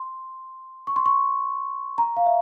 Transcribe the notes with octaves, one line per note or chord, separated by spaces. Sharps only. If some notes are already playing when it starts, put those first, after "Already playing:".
Already playing: C6
C#6
C6
C#6
A#5
F5
E5